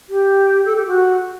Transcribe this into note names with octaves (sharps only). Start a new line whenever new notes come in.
G4
A4
G4
F#4